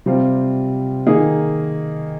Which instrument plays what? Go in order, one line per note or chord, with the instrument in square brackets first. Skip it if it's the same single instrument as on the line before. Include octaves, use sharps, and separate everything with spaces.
[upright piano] C3 G3 C4 F4
D#3 A#3 D#4 G#4